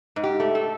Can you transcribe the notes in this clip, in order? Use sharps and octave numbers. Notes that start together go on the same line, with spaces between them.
G#2
G4
A3
A4